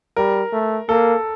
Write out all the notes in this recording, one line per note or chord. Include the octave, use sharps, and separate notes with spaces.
G3 A#4
A3
A#3 A4